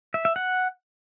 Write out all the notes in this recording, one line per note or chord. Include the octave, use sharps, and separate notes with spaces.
E5
E5
F#5